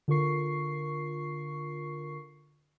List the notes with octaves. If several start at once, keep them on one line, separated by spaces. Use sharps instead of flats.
D3 F4 A#4 C#6 C7